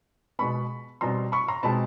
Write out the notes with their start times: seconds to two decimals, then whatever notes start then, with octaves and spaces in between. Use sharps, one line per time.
0.39 B2 G#3 B3 B5 C#6
1.01 B2 G3 C4 A#5 C6
1.32 B5 C#6
1.48 A#5 C6
1.63 B2 G#3 C4 A5 B5